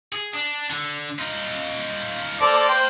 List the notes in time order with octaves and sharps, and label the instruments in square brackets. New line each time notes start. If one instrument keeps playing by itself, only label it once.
[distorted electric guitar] G#4
D4
D3
D#4 F4
[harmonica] A4 C5 D5 [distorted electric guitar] A#4 F5
[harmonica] C5 G5